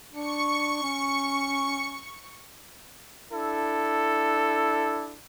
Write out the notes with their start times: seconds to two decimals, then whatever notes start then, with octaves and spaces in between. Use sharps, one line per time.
0.13 D4 C#6 C#7
0.83 C#4
3.32 D4 E4 A4